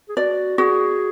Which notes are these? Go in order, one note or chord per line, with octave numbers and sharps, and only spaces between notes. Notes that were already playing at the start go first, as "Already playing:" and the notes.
G#4
F#4 D5
F#4 G#4